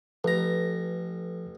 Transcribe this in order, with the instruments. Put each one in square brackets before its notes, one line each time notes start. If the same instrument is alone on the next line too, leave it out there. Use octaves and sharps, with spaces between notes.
[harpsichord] A1 A#5 [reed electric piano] F3 A4 B4